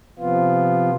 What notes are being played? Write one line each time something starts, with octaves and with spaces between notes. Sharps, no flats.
C3 F3 B3 F4